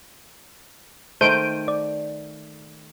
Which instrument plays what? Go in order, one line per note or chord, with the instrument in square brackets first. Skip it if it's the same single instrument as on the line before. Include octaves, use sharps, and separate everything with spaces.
[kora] D#3 A3 [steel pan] C5 [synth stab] G6 D7 [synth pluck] D#7
[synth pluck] D5